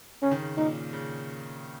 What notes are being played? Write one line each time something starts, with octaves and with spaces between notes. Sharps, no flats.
C#3 C#4
D#3
C#3
A#2 D#4
C#3